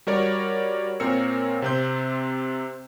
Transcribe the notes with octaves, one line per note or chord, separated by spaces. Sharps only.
G3 F#4 A#4 C#5 D5
A#2 C4 A#4 C#5 E6 C#7
C3 C4 G6